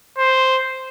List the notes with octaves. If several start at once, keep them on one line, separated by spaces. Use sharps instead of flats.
C5